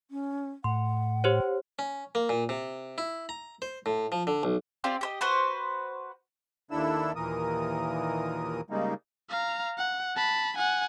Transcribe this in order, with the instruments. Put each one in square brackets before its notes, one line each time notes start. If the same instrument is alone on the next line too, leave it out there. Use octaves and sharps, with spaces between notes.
[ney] C#4
[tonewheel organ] A2 [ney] F#5 [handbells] C6
[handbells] G4 C5 C#5
[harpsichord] C#4
A#3
A#2
C3
E4
A#5
C5
A2
F3
D3
B1
[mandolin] C4 F4 G4 D5
G4 C5 D#5
F#4 B4 C5
[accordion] D#2 D4 E4 A4 E6
D#2 A#2 E3 A#4 D#6
C#3 G3 G#3 A#3 D#4
[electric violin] F5 A#5
F#5
A5 B5
F#5 G#5